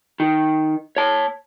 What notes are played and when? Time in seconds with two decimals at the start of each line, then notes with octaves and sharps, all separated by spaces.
0.20 D#3
0.96 C#5 A5